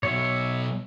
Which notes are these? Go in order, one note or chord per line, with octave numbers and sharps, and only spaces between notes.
B2 F#3 C#5 E5